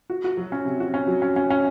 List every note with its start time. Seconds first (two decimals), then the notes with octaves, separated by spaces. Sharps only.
0.10 F#4
0.24 F#4
0.37 F#3
0.52 C#4
0.65 C3
0.80 F#4
0.94 C#4
1.08 F#3
1.22 C#4
1.36 C#4
1.50 C#4